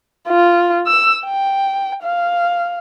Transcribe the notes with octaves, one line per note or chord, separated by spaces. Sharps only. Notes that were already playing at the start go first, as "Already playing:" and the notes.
F4
E6
G5
F5